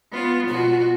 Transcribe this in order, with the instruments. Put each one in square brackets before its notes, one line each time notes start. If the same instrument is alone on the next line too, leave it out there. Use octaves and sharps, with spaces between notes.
[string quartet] B3 F4
[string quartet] B2 F#4 [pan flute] F4